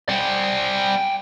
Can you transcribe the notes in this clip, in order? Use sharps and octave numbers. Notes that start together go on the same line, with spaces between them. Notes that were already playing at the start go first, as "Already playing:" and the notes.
G3 C4 F#5 G5